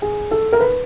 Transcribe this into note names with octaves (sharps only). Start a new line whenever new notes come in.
G#4
A4
A#4
B4